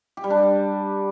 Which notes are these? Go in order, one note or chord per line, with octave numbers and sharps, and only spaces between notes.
G4
G3
D4